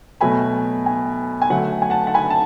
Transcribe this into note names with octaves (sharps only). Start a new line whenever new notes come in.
B2 F#3 A3 G#5 B5
G#5
G#5
D3 F#3 A3 F#5
G#5
F#5 A5
F#5 A5
G#5 B5
A5